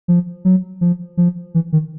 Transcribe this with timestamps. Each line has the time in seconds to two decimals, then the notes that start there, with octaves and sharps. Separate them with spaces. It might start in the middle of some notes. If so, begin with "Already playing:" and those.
0.08 F3
0.45 F#3
0.81 F3
1.17 F3
1.54 E3
1.72 D#3